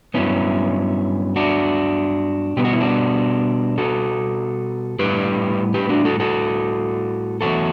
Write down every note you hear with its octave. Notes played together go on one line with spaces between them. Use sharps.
G2 F#3 B3 C#4 E4
D4 F#4
B2 G3 B3 G4
F#4
E4
D4 F#4
F#4 A4
A2 G3 B3 G4 B4
G4 B4
D4 F#4
F#4 A4
F#4 A4
E2 C#3 F#3 A3 F#4 A4